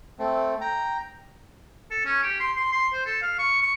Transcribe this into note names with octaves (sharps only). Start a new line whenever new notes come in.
A3 C4
G5 A#5
A4
C#4
G4
C6
C6
C6
C5
A4
F5
C#6
C#6